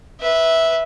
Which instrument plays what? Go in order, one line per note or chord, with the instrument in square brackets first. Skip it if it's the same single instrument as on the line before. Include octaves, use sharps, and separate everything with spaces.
[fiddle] B4 E5